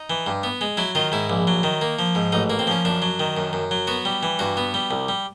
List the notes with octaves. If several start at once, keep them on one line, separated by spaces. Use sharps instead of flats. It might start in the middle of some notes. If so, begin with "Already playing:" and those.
Already playing: D#4
E3
G2
B3
G#3
F#3 E4
D#3 F4
G#2 E4
A#1
F#3
D#3
A#3
F3
G#2
A1 D#4
A#3
C4
F3 C#4
F#2 D4
F#3
D#3
F#2
F#2
F#3
B3 F#4
G3
E3
G2 F#4
B3
G3
C2
G3